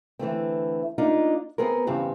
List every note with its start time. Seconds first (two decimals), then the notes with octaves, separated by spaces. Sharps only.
0.19 D3 E3 A3 C4
0.98 A#3 D4 D#4 F4
1.58 B3 C4 G#4 A#4
1.87 E2 G2 C#3 C4 G4